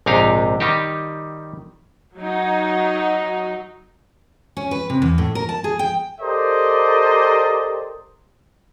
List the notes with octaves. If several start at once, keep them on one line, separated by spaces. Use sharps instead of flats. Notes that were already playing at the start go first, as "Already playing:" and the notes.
A#1 G#2 C3 D#4 G4 F5
D#3 G3 D#4 G4
F#3 D#4
C#4
B4
C3
E2
A2
A#4
A5
G#4
G5
G4 A4 A#4 C5 D5 D#5